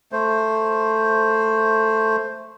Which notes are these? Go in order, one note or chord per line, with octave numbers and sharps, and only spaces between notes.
A3 C5